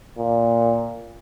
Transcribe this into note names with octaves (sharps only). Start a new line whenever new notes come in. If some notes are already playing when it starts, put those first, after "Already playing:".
A#2